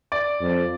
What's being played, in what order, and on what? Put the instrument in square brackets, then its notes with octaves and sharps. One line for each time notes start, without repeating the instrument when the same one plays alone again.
[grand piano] D5
[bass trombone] F2